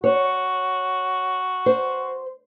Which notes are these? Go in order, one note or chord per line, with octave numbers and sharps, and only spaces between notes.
F#4 C#5
C5